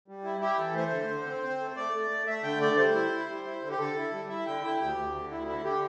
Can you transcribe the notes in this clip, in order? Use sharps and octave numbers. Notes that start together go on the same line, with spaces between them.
G3
E4
E4 G4
E3 A4
A3 C5
D3
D3
C4
C4
A3
A3 D5
A3
A3
A3 E5
D3 G5
A3 D5
G3 C5
E4
E4
G3
E4
D3
G4
D3 A4
E4
G3
E4 E5
D3 G5
E4 G5
D2 G4
D2
D3
D2 E4
D3 E4
D3 G4